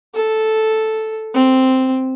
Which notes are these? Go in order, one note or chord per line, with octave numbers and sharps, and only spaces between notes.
A4
C4